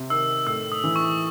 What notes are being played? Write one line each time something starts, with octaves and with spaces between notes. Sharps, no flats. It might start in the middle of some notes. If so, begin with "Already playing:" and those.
Already playing: C3
D#3 E6
A2 E6
D#6
E3
C#6